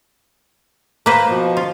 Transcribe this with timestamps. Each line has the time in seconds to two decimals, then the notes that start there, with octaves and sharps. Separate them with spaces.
1.06 A#3 B4 C5
1.29 B2 F3
1.57 F4